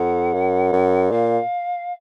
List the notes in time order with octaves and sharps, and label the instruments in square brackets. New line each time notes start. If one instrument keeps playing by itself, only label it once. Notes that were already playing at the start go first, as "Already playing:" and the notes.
Already playing: [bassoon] F2 [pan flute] F#5
[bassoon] F#2
F#2
[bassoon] A#2 [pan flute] F5